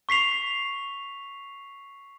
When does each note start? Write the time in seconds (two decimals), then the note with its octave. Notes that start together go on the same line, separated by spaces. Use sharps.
0.09 C#6 B6 C7 F7